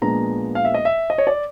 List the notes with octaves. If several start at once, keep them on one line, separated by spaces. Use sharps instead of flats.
A#2 F3 G#3 B3 D4 A#5
F5
E5
D#5
E5
D#5
C#5
D5